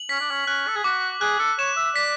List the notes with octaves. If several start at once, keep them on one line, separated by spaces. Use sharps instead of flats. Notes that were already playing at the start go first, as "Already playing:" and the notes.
Already playing: F#7
C#4 B6
D4
C#4
C#4 F#6
A4
G#4
F#4 D6
G#4 F#6
A4
C#5 E7
E5
D5 B6